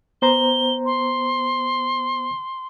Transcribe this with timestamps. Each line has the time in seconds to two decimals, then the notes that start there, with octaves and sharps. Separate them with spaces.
0.22 B3 C5 A#5 G7
0.86 C6